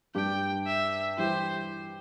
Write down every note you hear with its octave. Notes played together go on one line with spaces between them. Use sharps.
G2 G3 D4 G4 G5
E5
E3 G3 E4 G4 C5